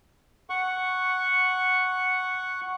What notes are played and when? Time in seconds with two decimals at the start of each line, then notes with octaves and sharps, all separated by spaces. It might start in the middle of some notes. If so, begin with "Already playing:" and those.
0.49 F#5 C#6